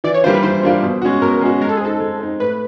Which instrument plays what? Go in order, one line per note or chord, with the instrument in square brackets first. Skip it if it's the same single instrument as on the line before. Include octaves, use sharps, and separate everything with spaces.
[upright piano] E3 [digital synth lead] D5
[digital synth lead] C#5
[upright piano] G3 A#3 D4 F4 [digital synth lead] C5
[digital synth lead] B4
[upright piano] E3 [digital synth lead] C5
[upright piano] G3 A#3 D4 F4
B2
G#3 C#4 F#4
[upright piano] B2 [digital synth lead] A#4
[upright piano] G#3 C#4 F#4
[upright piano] G#3 [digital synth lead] A#4
[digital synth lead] A4
G#4
[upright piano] C4 D#4 [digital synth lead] A4
[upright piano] G#3
C4 D#4
[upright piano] A2 [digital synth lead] B4